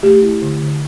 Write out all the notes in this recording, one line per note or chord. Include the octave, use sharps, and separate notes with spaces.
A3 G4
E4
D3
D3